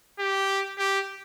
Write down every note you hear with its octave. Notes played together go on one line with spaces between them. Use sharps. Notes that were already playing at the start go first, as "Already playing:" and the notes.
G4
G4